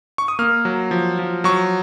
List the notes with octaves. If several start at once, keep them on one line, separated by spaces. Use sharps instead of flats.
C#6
D#6
A#3 F6
F#3
F3
F3
F#3 C#6